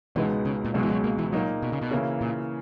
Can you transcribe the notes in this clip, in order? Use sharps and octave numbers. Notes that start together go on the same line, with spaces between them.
C#2 B2 E3 G#3 B3 D#4
C#3
A#2
C#2 B2 F#3 G#3
E3
F#3
A#3
E3
A#2 F#3 A#3 D#4
B2
C#3
B2
C#3 E3 A#3 E4
A#2